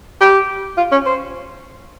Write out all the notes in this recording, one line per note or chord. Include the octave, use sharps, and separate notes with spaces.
G4
F4
C#4
C5